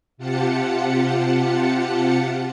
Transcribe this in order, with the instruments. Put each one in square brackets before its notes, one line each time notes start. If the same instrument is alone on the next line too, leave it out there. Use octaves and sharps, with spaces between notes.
[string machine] C3 F4 G4 F#5 A5 C#7